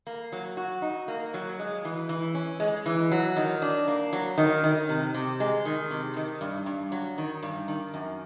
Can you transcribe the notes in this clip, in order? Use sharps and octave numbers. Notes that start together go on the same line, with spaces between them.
A#3
F#3
F#4
D#4
A#3
F#3
G#3
E3
E3
C#4
G#3
E3
F#3
D#3
D4
A#3
F#3
D#3
D#3
C3
C3
G#3
D#3
C3
D#3
G2
G2
F#3
D#3
G2
D#3
F#2